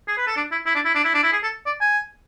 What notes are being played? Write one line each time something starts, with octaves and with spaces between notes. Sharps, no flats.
G#4
B4
A4
D4
E4
E4
D4
E4
D4
E4
D4
E4
G#4
A4
D5
G#5